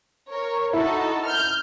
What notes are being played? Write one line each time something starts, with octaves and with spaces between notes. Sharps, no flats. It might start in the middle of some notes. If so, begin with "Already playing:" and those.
A#4 C#5
D#4 E4 F#4 A4
F6 G6